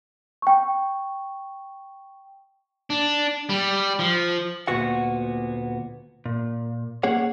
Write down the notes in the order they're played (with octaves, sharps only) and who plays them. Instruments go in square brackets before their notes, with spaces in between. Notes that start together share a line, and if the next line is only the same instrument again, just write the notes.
[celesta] G5 C#6
[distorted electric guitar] D4
G3
F3
[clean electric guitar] D2 A#2 B3 F#4 F#5
A#2
A#3 C#4 G#4 C#5 F#5